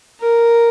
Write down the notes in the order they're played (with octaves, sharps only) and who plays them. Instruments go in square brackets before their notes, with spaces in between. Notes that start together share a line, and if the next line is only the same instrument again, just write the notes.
[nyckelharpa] A#4